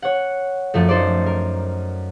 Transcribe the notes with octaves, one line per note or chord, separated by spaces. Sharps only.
C#5 F#5
F#2 F3 A3
D#4 A4 C5 D5
A#4